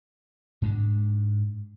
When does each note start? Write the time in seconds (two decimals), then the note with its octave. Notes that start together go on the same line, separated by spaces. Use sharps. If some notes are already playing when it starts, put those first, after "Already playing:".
0.62 G#2 G#3 D4